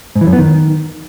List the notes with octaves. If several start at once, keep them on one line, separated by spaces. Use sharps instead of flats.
G#2
E3
F#2
B3
D#3